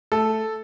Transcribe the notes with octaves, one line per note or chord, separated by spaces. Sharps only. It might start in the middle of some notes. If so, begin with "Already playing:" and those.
A3 A4